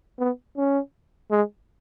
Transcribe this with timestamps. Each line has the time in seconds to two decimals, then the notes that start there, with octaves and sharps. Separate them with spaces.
0.19 B3
0.57 C#4
1.31 G#3